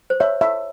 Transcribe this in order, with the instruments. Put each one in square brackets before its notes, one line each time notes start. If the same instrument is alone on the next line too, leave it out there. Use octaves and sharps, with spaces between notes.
[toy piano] C5
[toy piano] C#5 [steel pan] E5
[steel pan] E5